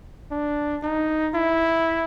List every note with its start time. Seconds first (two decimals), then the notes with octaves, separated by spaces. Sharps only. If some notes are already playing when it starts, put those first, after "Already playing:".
0.31 D4
0.83 D#4
1.35 E4